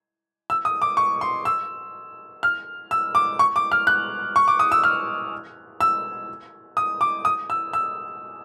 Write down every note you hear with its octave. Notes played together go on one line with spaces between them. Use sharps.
E6
D#6
D6
C#6
C6
E6
F6
E6
D6
C#6
D6
F6
F#6
C#6
D6
D#6
E6
F6
E6
D#6
D6
D#6
E6
E6